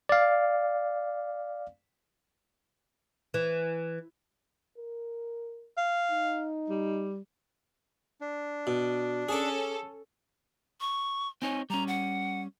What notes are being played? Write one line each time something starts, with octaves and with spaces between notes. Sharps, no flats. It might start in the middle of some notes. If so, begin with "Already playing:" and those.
D5 F5
E3
A#4
F5
D#4
G3
D4
B2
C#4 G#4 A4 D6
C#6
C4 D#4 C#5 G#5
G3 C#4 A#5
F#5